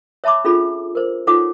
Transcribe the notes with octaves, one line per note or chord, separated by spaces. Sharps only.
C#5 E5 A5 B5 D6
C#4 D4 F4 G#4 A4 B5
A#4 C5
D#4 F4 A4 C#5 F#5 D6